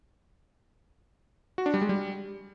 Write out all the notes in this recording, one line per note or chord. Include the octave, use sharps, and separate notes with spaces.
F#4
D4
G3
G#3
G3